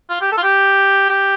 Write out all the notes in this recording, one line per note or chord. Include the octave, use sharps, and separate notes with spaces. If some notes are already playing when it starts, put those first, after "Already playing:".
F4
G4
A4
F4
G4
G4